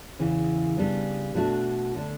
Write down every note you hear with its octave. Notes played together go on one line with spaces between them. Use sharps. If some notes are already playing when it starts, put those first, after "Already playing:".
E2 C#3 E3
C#3 G3 B3 D4
B2 A3 D4 F#4
D3 A3 D4